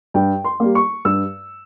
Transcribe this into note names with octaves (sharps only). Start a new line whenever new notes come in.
G2 G5
C6
G3 A#3
C#6
G2 E6